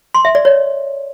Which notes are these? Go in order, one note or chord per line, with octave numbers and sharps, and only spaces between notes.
C6
E5
D5
C#5